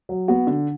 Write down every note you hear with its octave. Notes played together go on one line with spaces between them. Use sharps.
F#3
B3 F#4
D3